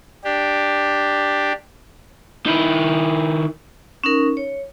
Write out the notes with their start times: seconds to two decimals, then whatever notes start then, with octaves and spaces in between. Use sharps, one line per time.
0.24 D4 G4
2.46 D#3 E4
4.04 C#4 D#4 A#4
4.37 C#5